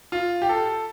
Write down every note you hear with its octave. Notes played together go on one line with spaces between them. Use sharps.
F4
G4
A4